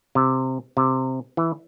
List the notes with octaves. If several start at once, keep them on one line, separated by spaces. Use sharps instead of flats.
C3
C3
E3